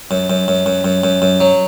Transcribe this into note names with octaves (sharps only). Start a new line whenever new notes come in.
F#2
F#2
F#2
F#2
F#2
F#2
F#2
F#3